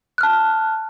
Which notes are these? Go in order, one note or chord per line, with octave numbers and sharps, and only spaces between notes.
A5 F6 F#6